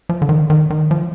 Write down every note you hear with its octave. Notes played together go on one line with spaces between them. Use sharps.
F3
D3
D#3
D#3
D#3
F3